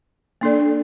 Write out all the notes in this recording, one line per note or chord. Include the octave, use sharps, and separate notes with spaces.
A#3 D4 A4 D5